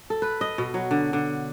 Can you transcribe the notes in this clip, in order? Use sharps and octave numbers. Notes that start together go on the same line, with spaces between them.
A4
B4
D#5
B2
F#3
D3
D3